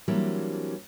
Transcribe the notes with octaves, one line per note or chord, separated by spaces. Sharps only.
E3 F#3 G3 A#3 C4 D4